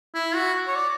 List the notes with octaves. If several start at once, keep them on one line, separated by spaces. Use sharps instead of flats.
E4
F#4
C#5
D5